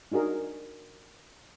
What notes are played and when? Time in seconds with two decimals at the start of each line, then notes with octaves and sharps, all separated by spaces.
0.12 D4 D#4 F#4 G#4 A#4